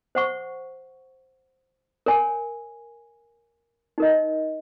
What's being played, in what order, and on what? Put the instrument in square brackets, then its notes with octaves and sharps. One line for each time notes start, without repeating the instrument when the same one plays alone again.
[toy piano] C5 F#5 C#6
A#4 C#5 G#5
D#4 A#4 D#5